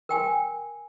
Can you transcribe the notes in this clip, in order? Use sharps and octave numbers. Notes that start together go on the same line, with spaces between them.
A#4 G5 G#5